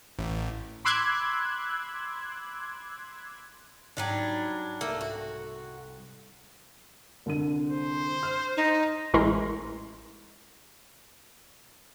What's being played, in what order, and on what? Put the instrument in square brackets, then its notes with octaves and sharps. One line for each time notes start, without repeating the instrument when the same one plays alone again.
[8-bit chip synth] A1
[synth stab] B5 C6 D6 E6 F#6 G#6
[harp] G#2 [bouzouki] F#3 G3 D4
[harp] C2 A4 [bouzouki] A3 A#3
[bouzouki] F#4
[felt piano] C2 D3 D#7
[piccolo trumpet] C5
[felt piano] F6
[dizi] D#4
[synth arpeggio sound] A1 G#3 E4 A#4 A#5 C6